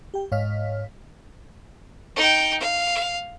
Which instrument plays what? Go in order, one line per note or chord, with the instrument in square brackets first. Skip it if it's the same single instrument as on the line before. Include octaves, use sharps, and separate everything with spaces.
[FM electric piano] G4 G5
G#2 C#5 D#5 F5 F6 B6
[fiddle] D#4 G5
F5